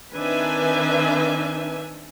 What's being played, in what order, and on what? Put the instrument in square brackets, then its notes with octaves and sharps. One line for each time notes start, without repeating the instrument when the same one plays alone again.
[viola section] D#3 C4 D4 B4 E5 G#5